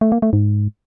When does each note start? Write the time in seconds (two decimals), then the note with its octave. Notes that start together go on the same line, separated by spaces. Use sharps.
0.01 A3
0.12 A#3
0.22 A3
0.33 G#2